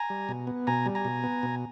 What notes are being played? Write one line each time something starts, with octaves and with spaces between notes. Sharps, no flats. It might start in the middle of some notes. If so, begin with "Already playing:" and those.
Already playing: G#5 A#5
G3
B2
B3
B2 G#5 A#5
G3
G#5 A#5
B2
B3
B2